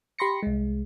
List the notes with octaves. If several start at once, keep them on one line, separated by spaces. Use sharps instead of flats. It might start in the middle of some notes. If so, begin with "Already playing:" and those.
G4 B5 C6 A#6 C#7
C2 G#3